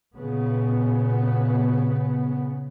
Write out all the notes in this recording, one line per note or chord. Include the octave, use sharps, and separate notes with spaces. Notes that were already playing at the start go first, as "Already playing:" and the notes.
A#2 C#3 B3